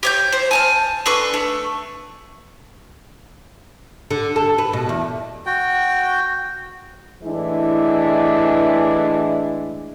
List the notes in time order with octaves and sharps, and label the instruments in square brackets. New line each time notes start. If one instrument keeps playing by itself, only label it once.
[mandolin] G4 C#5 G6
C5
G#5 A5 F6
D4 A4 B4 C#6
A3
[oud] D3
A4
B4
B2
E2
[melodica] F#4 G5
[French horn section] A2 E3 G#3 D4 E4